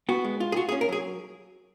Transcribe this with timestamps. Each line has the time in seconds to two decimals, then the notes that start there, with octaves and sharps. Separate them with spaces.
0.09 B3 F#4
0.24 G#3
0.40 F4
0.52 G#4
0.56 F4 F#4
0.69 G#4
0.72 C#4
0.81 A#4
0.89 F#3 G#4